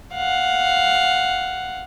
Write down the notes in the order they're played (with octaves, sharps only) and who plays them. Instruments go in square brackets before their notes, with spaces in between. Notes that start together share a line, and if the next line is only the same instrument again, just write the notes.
[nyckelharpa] F5 F#5